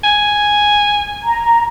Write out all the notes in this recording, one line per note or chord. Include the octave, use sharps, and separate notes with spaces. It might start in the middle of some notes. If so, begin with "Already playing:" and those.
G#5
A#5